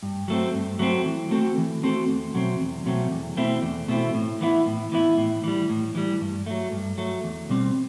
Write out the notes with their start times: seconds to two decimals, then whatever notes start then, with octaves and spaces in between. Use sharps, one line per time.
0.03 G2
0.28 F#3 A3 C4
0.54 G2
0.79 F#3 A3 C4
1.05 E3
1.31 A3 C4 F#4 A4
1.58 E3
1.83 A3 C4 F#4 A4
2.08 E2
2.34 B2 F#3 A3 C4
2.60 E2
2.86 B2 F#3 A3 C4
3.12 E2
3.37 B2 A3 C4 E4
3.62 E2
3.88 B2 A3 C4 E4
4.14 A2
4.41 E3 B3 E4
4.66 A2
4.92 E3 B3 E4
5.18 A2
5.44 E3 G3
5.70 A2
5.95 E3 G3
6.21 G2
6.46 F#3 A3
6.72 G2
6.98 F#3 A3
7.24 E2
7.49 B2 G3 C4